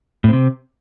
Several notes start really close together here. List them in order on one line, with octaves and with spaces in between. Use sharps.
A2 C4 C3